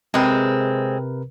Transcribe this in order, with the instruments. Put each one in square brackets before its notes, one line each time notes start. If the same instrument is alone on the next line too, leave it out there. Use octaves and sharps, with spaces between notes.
[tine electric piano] C3 A#4 B4 [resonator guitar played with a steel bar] G#3 C4